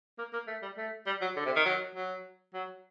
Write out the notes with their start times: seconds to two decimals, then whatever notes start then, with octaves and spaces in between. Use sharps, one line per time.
0.18 A#3
0.33 A#3
0.47 A3
0.62 G3
0.78 A3
1.06 G3
1.21 F#3
1.36 D3
1.46 C3
1.56 D#3
1.65 F#3
1.95 F#3
2.54 F#3